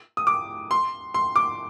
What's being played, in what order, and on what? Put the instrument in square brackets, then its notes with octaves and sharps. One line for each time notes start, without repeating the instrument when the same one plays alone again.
[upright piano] D#6
D6
C6
C6
D6